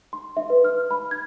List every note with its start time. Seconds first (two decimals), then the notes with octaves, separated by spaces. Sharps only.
0.13 C6
0.37 E5
0.50 B4
0.64 F6
0.91 B5
1.11 G#6